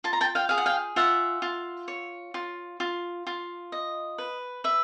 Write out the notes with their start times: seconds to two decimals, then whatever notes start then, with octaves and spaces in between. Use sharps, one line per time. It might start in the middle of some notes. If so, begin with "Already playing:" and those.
0.04 F4 A5
0.13 A#5
0.21 G5 A5
0.35 F5 G5
0.49 G#4 F5
0.58 F#5
0.66 F5 G5
0.96 F4 E5 F#5
1.42 F4
1.88 C#5
2.34 F4
2.80 F4
3.27 F4
3.72 D#5
4.18 B4
4.64 B4 E5